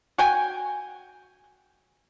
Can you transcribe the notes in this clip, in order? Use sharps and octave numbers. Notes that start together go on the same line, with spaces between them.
F#4 G5 G#5